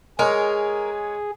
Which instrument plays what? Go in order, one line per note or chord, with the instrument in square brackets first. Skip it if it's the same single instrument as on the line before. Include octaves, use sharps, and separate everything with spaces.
[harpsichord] G#3 [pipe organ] G#4 [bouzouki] A#4 [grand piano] C#5 G#5